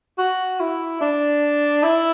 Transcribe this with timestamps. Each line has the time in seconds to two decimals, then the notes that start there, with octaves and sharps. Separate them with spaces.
0.18 F#4
0.60 E4
1.01 D4
1.83 E4